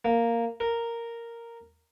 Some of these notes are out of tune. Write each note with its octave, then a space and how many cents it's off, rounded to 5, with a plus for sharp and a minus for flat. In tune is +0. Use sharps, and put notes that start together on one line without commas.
A#3 -5
A#4 -5